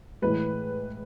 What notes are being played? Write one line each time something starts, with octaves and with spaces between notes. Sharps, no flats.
A2 E3 G#3 B4